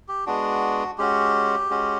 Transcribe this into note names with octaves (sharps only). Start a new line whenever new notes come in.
G4
G#3 B3 D4 F#4
G#3 C#4 F#4 G4
G#3 C#4 F#4